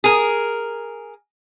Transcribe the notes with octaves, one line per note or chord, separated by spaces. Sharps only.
G#4 A#4